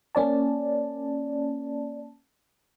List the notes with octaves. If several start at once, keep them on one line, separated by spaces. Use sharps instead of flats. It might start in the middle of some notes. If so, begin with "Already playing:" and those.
A#3 C#4 D5 A5